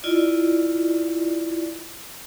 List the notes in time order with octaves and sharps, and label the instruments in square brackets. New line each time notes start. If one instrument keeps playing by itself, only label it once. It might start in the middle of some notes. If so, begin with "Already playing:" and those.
[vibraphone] E4 F4 D5 D#5